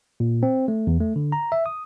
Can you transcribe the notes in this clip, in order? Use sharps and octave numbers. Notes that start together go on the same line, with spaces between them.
A#2
C4
A3
E2
A3
D3
A#5
E5
D#6